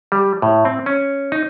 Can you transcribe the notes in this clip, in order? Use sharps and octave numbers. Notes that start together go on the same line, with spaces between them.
G3
A2
C4
C#4
D#4